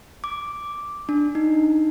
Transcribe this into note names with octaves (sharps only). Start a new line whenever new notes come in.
D6
D4
D#4